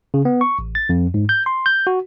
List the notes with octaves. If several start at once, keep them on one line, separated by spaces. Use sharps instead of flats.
C#3
B3
C#6
A1
A6
F2
G#2
G6
C6
G6
F#4